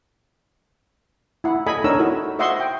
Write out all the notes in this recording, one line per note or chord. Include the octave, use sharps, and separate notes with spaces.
E4 F#5
A4 D#5 G#5 B5
D4 D#4 A#4 C#5 E6
E4 F#4 A4
C5 D#5 E5 F#5 C6 C#6
G5